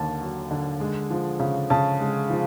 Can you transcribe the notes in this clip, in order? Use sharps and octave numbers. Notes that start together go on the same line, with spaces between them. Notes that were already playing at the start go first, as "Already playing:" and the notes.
Already playing: D#2 D3 A#3 A5
F#3
D3
G#3
F3
C#3
C#3 A5
G#3
F3